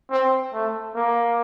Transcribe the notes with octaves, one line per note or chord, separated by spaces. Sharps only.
C4
A3
A#3